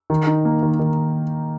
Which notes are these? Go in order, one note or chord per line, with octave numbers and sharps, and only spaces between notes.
D#3
D#4
A#3
D#3
D#3